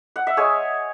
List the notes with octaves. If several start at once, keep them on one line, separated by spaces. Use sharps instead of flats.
F#5
E5
G#3 G#4 C#5